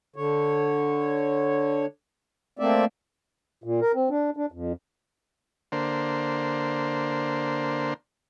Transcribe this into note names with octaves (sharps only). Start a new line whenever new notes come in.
D3 C#5
A3 A#3 C4 D5 E5
A#2
A#4
C4
D4
D4
F2
D3 A#3 C5